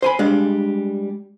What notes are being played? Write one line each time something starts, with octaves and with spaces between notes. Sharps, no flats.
C5 G#5 B5
G3 G#3 D4 F5